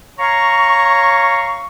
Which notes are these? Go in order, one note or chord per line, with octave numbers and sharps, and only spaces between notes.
C#5 F5 A#5 C#6